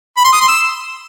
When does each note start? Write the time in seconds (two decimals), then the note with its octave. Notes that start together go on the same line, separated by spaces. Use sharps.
0.17 B5
0.25 C6
0.32 D#6
0.40 C6
0.48 E6